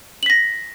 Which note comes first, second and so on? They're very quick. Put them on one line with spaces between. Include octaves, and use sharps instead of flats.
F#7 B6 A#6